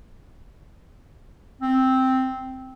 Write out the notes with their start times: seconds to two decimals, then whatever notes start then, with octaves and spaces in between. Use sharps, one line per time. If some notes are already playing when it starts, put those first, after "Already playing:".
1.62 C4